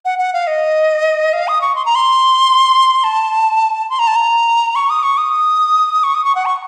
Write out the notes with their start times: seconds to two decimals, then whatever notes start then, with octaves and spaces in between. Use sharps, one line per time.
0.05 F#5
0.19 F#5
0.33 F5
0.47 D#5
1.33 F5
1.48 D#6
1.61 C#6
1.75 C6
1.86 A#5
1.95 C6
3.04 A5
3.90 C6
3.99 A#5
4.07 A5
4.16 A#5
4.76 C#6
4.90 D#6
5.03 C#6
5.17 D#6
6.04 C#6
6.15 D#6
6.25 C#6
6.35 F#5
6.46 C#6